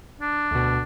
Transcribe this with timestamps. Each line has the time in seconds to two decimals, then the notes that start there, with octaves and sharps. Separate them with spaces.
0.21 D4
0.51 D2 B2